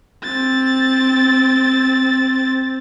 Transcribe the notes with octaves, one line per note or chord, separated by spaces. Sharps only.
C4 A6